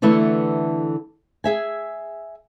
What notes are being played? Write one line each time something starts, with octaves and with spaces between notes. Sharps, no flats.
D3 E3 A3 B3 E4
G#4 E5 G#5